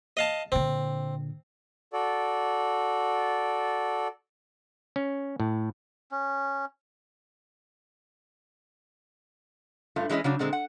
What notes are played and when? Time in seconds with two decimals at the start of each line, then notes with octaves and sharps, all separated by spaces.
0.17 D#5 F5 A5
0.52 A#2 D3 C4
1.93 F#4 A4 D5
4.96 C#4
5.40 A2
6.11 C#4
9.96 G2 A3 F4
10.09 E3 G#3 C#4 E4 D#5
10.24 C#3 F#3 D4
10.39 A#2 D3 G#3 C4
10.53 F#5